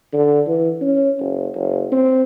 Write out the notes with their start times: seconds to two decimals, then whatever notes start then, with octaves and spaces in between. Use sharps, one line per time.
0.13 D3
0.47 E3
0.81 C#4
1.20 F#1
1.55 F#1
1.92 C4